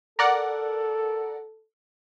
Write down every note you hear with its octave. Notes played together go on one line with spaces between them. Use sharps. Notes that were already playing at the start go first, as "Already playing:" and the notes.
A4 A#4 D5 F#5